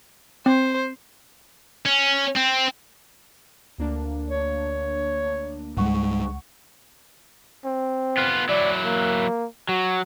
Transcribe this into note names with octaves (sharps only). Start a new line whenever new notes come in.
C4 C5
C#4
C4
D2 A#3 D4
C#5
C#2 G#2 G3 G#3 F#5 C#6
C4
B3 F4
F#3 E4 D5
A#3
F#3 F#4